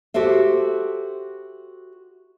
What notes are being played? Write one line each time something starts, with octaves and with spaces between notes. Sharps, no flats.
F#4 G4 A4 C5 E5